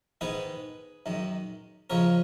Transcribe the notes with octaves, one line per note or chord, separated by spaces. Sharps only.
G#2 D#3 G#3 B3 G#4 B4
F#2 D#3 G#3
F2 C#3 G#3 C#4 A#4 C#5